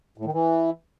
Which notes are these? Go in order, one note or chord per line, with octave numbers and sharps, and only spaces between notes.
A2
D#3
E3